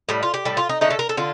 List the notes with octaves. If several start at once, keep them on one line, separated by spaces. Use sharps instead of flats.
A2 G3
F4
G4
A2 G3 A4
F4
D#4
D3 A3 D#4
A4
A#4
A4
D3 F4